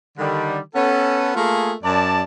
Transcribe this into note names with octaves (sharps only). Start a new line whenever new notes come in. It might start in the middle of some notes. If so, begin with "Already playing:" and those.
D3 D#3 G3
B3 C#4 A4
A3 A#3 F4 G#4
F#2 D5 A5